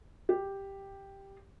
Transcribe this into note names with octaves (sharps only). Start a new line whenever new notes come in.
G4